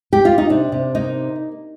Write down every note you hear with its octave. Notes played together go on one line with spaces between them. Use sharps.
G4
F4
D#4
C3 D4
C3
A#3 D#4